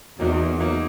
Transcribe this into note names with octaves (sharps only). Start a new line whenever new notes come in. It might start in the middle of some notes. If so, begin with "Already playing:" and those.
E2 F#3 A#3 D#4 F#4
F#3 A#3 D#4 F#4